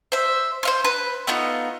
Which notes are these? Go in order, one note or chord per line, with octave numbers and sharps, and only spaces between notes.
C5 E5
C5 F5 C6
B4
A3 B3 D#4 F4